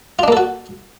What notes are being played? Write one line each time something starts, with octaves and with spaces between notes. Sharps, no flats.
A#3 D4 F4 F#4 A4